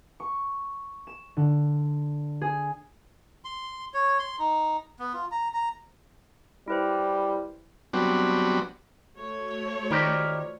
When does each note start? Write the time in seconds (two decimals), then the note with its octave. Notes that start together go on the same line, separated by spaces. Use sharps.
0.20 C#6
1.07 E7
1.37 D3
2.41 G#4
3.45 C6
3.94 C#5
4.19 C6
4.39 D#4
4.99 B3
5.13 F4
5.31 A#5
5.54 A#5
6.68 G3 E4 B4 C5
7.93 F#3 G3 B3 C4 D4 F#4
9.17 A3 F#4 C#5
9.91 D#3 D#4 F4 G4 A#4 C5 D5